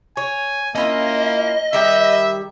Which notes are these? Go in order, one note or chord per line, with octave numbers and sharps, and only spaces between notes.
C#5 G#5
A#3 C#4 E4 F4 D#5
D#3 G3 E5 G5